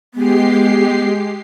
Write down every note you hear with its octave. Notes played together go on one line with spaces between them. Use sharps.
G#3 B3 G4 C7